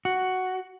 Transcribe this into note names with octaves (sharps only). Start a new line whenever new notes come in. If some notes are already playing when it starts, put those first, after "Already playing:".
F#4